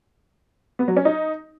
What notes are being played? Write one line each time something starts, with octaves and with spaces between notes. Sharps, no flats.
B3
F#3
C#4
D#4